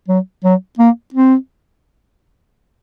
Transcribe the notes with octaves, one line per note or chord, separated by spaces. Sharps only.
F#3
F#3
A#3
C4